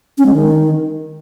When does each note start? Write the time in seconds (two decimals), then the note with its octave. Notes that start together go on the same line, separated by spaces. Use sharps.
0.18 C#4
0.26 G#3
0.34 D#3